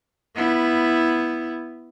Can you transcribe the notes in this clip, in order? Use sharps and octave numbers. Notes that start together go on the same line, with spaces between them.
B3 E4